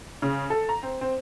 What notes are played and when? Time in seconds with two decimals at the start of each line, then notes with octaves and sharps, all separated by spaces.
0.22 C#3
0.50 A4
0.69 A#5
0.83 C4
1.01 C4